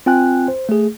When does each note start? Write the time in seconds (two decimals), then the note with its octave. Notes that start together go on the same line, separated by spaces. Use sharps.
0.06 C4 F4 G5 G#5 F#6
0.48 C5
0.69 A3 G#4